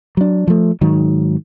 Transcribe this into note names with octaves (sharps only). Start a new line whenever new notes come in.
F#3 D4
F3 A3
G#2 D#3 F#3